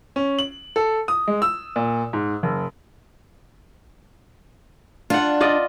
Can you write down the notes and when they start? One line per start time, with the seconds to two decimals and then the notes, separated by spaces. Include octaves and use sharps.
0.16 C#4
0.39 F#7
0.76 A4
1.08 D#6
1.28 G#3
1.42 E6
1.76 A#2
2.13 G#2
2.43 F#1
5.10 D4 F4 F#5
5.40 F4 D5 D#5